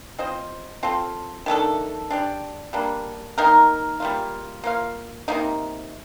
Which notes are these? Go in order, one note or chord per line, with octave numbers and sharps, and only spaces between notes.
C4 F4 C5 D#5
C4 F4 A4
D#3 A3 D4 A4
D4 G4 D5
G3 A#3 D4
D#3 A#3 D#4 A#4
G3 A#3 F4
A#3 F4 C5 F5
C3 F3 A#3 D#4